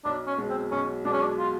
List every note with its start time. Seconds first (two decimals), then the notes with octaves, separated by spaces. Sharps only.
0.05 B1 D4
0.27 C#4
0.38 B2 G#3
0.50 C4
0.71 B1 C#4
1.05 B2 G#3 D4
1.13 C#4
1.21 D4
1.38 F4